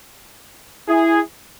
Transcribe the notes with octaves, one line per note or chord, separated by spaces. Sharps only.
E4 G#4